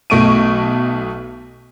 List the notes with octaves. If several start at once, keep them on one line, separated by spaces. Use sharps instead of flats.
B1 B2 A3 C#6 D7 D#7